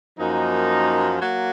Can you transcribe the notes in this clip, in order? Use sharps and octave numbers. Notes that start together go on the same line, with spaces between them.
F#2 F3 A#3 D#4
F#3 A#3